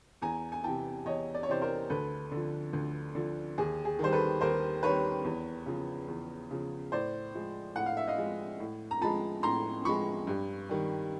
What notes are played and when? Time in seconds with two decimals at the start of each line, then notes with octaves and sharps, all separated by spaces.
0.22 E2 G#5 A#5
0.52 G#5
0.64 C3 E3 G5 A5
1.05 E2 C#5 D#5
1.35 D5
1.43 C#5
1.48 C3 E3 C5 D5
1.62 A#4 C5
1.90 D2 A4 B4
2.32 D3 F3
2.73 D2
3.15 D3 F3
3.58 D#2 G#4
3.85 G#4
3.99 D#3 G3 C5
4.13 A4 B4
4.41 D#2 A#4 C5
4.83 D#3 G3 B4 C#5
5.24 E2
5.66 C#3 F3
6.08 E2
6.51 C#3 F3
6.92 A2 C5 D5
7.34 F3 G#3
7.75 A2 F#5
7.86 F5
7.97 E5
8.07 D#5 F5
8.18 F3 G#3
8.60 A2
8.91 A#5
9.01 F3 G#3 A5 B5
9.43 A2 A#5 C6
9.85 F3 G#3 B5 C#6
10.27 G2
10.69 D#3 G3